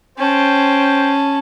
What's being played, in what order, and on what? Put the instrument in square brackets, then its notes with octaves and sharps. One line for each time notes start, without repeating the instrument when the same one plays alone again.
[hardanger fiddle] C#4 A5 [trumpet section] C5 G5